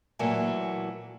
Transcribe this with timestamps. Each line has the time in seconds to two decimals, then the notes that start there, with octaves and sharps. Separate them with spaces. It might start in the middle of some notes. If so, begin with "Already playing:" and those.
0.19 A#2 E3 F#3 A3 A#3